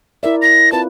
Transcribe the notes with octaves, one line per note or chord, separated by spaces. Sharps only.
E4 A#4 D5 E5
A#6
C4 F4 B4 A5